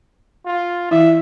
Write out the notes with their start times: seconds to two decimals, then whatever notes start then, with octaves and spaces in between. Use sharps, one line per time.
0.46 F4
0.91 E3 E4 E5